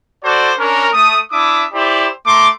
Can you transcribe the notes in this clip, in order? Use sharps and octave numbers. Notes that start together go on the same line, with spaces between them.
F#4 A4 C5 D5
C#4 D4 A#4
A3 D#6
D4 E4 E5 D6 D#6
E4 G4 C5 D5 B5
A3 A#5 C6 D6